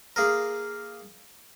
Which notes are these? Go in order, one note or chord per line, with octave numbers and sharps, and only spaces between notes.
A#3 G#4 A#4